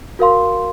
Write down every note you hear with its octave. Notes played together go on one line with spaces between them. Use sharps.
F#4 A#4 F5 C6